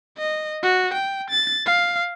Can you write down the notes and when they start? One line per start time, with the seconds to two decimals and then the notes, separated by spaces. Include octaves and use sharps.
0.18 D#5
0.63 F#4
0.94 G5
1.30 A6
1.66 F5